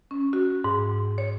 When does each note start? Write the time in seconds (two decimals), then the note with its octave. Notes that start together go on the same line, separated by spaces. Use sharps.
0.11 C#4
0.33 F#4
0.64 G#2
1.18 C#5